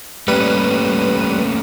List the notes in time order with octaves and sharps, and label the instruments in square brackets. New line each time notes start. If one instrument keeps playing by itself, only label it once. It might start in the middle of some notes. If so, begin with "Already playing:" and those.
[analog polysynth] G3 B4 D#7 [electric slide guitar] A3 A#3 C#4